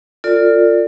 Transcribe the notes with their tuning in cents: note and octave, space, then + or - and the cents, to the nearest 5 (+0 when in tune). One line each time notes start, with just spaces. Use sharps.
F4 +5 A4 +40 D5 +0